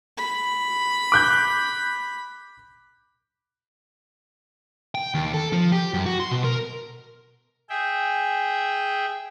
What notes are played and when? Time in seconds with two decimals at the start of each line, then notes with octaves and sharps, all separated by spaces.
0.17 B5
1.12 D6 F#6 G6
4.95 G5
5.14 D#2
5.34 A4
5.53 F3
5.72 G4
5.94 F#2
6.06 F#4
6.20 C6
6.32 B2
6.44 A#4
7.69 G#4 E5 G5